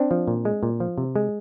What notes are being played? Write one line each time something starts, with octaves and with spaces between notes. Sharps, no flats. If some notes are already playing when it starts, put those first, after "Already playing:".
Already playing: C4 D4
F3
A#2
G#3
A#2
F3
C3
G#3